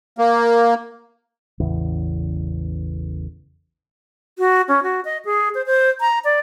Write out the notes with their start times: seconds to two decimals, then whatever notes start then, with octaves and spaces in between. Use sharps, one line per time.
0.18 A#3
1.60 A1 E2 C#3
4.38 F#4
4.68 C#4
4.83 F#4
5.05 D#5
5.25 G#4
5.55 C5
5.66 C5
6.01 A#5
6.25 D5